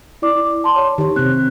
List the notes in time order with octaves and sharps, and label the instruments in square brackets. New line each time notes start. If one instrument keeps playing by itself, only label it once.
[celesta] E4 D5 D6
A5 C6
C#5
[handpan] D#3 C#5 [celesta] G4
[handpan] C3 C4 [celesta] F#6